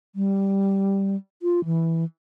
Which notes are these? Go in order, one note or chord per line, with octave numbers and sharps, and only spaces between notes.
G3
F4
E3